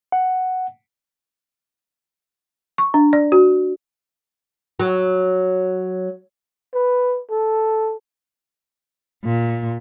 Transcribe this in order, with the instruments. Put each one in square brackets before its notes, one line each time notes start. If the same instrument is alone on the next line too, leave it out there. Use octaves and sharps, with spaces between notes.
[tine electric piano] F#5
[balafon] C#6
D4
D5
F#4
[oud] F#3
[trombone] B4
A4
[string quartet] A#2